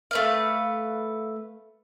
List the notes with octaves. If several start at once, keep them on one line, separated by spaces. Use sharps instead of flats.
A3 B4 F5